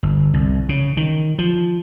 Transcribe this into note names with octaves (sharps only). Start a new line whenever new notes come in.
G1
C2
C#3
D#3
F3